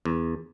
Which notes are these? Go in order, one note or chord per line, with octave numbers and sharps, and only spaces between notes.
E2